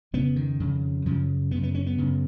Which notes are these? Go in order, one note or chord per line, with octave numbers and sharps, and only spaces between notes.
F2 C#3 B3
D#3
F2 C#3
F#2 C#3 F3
F#2 C#3 B3
B3
C#4
B3
F#2 C#3